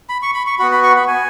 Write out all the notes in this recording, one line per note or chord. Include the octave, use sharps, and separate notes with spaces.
B5
C#6
B5
C#6
B3 F#4 B5
B5
C#6
B5
G#5